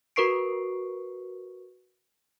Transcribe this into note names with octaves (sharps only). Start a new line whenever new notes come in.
F#4 A#4 B4 C#6 C7 D7